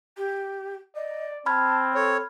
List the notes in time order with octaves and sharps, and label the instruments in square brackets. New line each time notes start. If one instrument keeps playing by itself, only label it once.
[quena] G4
[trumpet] D5 [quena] D#5
[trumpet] C4 [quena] A5 [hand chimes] B5 F6 G#6
[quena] A4 [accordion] C#5